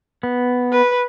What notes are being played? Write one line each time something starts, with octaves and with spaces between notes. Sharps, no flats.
B3
B4